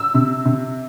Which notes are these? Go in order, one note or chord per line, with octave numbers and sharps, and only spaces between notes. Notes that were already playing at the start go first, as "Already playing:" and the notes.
Already playing: E6
C3
C3